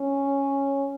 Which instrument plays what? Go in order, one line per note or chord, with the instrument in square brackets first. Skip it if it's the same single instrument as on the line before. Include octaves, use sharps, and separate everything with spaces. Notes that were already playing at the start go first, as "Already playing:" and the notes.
Already playing: [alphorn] C#4